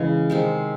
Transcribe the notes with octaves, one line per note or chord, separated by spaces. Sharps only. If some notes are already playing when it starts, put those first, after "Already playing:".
Already playing: C#3 E3 G#3
C3 D#3 G#3